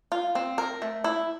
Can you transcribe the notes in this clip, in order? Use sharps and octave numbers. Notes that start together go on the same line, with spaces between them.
F4
C4
A#4
A3
E4